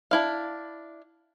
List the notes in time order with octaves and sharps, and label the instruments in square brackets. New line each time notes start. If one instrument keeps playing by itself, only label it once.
[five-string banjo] D4 E4 F5